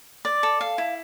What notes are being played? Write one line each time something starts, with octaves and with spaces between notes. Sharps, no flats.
D5
A4
F5
E4